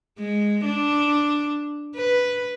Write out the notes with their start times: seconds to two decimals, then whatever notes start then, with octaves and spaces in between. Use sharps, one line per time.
0.20 G#3
0.65 D4
1.96 B4